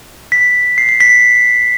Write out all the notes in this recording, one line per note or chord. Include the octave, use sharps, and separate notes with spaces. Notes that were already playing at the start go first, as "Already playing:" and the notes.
B6
C7
C7
B6